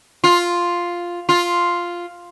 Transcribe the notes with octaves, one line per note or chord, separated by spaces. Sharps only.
F4
F4